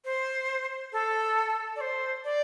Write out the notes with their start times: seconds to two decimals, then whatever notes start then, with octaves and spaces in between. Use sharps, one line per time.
0.05 C5
0.92 A4
1.76 D5
1.80 C5
2.24 D5